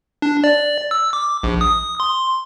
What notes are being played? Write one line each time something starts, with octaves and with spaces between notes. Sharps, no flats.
D4
D5
E6
D6
A#1
D#6
C6